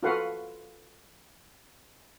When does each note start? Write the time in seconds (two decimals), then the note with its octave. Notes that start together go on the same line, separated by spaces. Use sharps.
0.03 F4 F#4 A4 B4 F5 F#5